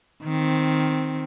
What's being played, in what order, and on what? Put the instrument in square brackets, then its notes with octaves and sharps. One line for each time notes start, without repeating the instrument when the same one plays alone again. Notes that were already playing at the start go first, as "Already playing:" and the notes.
[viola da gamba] D#3 C4